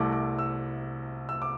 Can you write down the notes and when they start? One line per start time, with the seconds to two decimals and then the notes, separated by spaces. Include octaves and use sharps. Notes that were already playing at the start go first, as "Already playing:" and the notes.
Already playing: C2 C3 A3 C4 D6
0.12 D6
0.39 E6
1.29 E6
1.42 D6